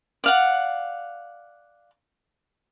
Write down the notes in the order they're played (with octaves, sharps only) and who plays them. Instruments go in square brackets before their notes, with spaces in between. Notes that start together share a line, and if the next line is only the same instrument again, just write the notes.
[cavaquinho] D5 F5 F#5